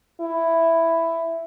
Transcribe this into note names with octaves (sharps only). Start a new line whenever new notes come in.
E4